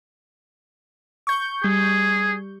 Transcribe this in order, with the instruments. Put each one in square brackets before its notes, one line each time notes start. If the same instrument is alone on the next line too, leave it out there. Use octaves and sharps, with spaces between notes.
[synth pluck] C#6 G6
[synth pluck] G3 [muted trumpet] G#4